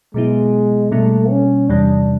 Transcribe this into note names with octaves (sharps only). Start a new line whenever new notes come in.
B2 F#3 G#3 B3 E4
B2 G3 A3 A#3 D4
C#4
E2 C3 E3 G3 D4